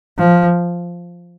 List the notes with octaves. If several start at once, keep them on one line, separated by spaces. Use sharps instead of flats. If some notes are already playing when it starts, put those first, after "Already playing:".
F3